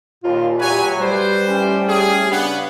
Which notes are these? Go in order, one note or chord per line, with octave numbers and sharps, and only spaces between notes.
D#2 A#2 F4
E2 A2 F#3 G4 B4 C#5 G#5
G3 B4 C5
A2 A3 C#4 G4
G#4
C#3 B3 D4